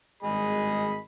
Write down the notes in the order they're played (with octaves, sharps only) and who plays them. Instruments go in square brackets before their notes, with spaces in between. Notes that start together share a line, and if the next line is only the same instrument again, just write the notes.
[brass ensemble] G#1 G2 G#3 [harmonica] G#4 D#5 B5